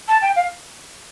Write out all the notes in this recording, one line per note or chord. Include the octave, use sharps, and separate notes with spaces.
A5
G5
F5